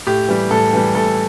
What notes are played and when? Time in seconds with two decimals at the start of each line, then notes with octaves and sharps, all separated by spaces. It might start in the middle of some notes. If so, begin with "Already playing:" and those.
0.07 A2 G4
0.28 E3 G3
0.51 A2 A4
0.73 E3 G3
0.95 A2 A4